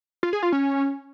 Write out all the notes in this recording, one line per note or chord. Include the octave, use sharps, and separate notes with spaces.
F4
G#4
F4
C#4